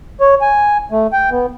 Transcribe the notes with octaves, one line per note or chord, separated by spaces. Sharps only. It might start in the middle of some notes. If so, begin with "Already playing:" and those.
C#5
G#5
A3
G5
B3